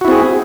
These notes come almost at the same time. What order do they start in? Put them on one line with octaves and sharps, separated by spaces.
F#4 E4 C4 G#4